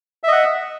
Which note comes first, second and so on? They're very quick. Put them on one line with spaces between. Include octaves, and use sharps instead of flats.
E5 D#5 F#5